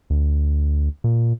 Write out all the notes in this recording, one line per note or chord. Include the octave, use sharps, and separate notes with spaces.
D2
A#2